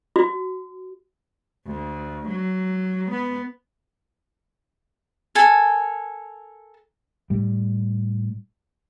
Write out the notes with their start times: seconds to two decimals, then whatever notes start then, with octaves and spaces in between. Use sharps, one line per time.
0.16 F#4
1.66 D2
2.28 F#3
3.11 B3
5.35 A4 A#4 G#5
7.30 A2 G3